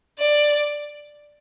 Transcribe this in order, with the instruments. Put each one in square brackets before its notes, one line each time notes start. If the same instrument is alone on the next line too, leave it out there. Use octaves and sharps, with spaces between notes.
[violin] D5